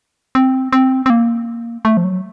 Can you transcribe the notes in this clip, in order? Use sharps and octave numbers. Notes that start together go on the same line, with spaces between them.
C4
C4
C4
A#3
A3
F3
F#3